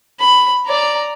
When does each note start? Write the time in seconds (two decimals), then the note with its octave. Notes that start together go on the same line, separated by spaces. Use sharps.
0.20 B5
0.66 D5 A#5